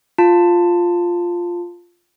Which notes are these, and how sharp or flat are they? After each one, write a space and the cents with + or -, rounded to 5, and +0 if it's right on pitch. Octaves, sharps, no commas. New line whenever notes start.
F4 +0 A5 +15